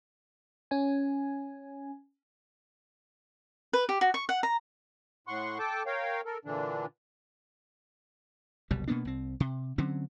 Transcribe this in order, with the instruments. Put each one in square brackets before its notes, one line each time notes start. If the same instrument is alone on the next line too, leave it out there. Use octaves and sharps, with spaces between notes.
[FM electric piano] C#4 G#5
[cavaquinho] B4
G4
F#4
C#6
F#5
A#5
[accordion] A2 F#5 C6 C#6
A4 G5 A5 D6
A#4 C#5 F5 G5
A4 A#4
A#2 D3 E3 D4
[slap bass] F#1 C2 B2 G3
B2 A#3 B3 D4
C2 C4
C3
D3 F#3 C4 C#4